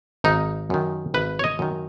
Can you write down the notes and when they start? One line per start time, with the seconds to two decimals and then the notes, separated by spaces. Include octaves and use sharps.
0.24 G#1 D#4
0.70 F#2 D#3
1.14 G#1 B4
1.39 C#5
1.44 D#5
1.59 F#2 D#3